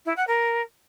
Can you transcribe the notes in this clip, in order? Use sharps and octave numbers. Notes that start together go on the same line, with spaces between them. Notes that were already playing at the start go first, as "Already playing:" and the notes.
E4
F#5
A#4